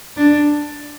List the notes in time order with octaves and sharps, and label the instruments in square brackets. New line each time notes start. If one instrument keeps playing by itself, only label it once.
[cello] D4